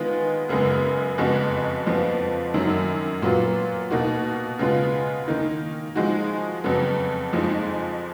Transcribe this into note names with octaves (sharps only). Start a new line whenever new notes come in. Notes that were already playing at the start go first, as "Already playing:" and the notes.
Already playing: D#3 G#3 B3 F4
F#2 C#3 G#3 B3
F2 C#3 G#3 B3 F#4
F2 F3 B3 F4
F#2 D#3 F#3 C#4
A#2 F#3 B3 F4
B2 A#3 D#4 F#4
C#3 G#3 B3 F4
D#3 A#3 D#4
F3 G#3 D#4 F#4
F2 C#3 F#3 B3
F2 F3 G#3 D#4